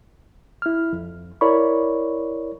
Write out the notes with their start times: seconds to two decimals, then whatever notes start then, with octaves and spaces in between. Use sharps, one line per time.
0.62 E4 F6
0.93 F2
1.41 E4 A#4 C#5 D5 B5 C#6